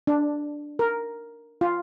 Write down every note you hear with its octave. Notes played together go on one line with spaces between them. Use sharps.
D4
A#4
F4